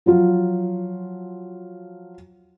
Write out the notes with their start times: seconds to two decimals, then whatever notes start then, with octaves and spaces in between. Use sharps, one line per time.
0.06 F3 F#3 F4